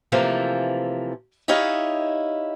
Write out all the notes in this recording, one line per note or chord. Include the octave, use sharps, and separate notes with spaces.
C3 E3 F3 A3 A#3
D#4 E4 G4 C#5 D#5 F5